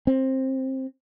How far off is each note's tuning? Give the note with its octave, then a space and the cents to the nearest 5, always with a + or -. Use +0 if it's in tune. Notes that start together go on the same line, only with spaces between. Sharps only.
C4 +15